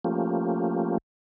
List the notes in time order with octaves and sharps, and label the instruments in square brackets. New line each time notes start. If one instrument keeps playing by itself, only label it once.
[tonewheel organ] F3 A3 A#3 C#4 F4 G4